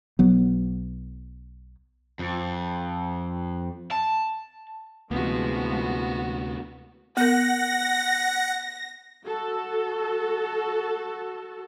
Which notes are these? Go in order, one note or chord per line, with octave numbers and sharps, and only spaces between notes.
B1 F#3 B3
F2
A5
D2 C3 E3 F3 G#3 B3 F#4
B3 A#4 F#5 A#6
F#4 A4